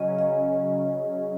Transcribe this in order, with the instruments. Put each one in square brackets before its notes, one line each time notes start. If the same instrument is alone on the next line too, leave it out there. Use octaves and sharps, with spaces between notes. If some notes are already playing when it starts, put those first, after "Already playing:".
Already playing: [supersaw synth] C#3 F#3 C#4 [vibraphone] D#5
[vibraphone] D#5